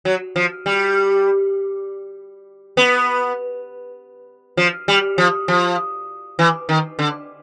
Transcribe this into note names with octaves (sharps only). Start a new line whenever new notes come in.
F#3
F3
G3
B3
F3
G3
F3
F3
E3
D#3
D3